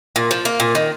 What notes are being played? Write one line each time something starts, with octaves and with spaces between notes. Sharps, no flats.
A#2
F3
A#3
A#2
D#3